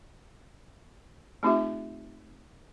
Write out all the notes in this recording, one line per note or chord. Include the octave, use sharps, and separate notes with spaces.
A3 C4 D#4 F4 G4 E5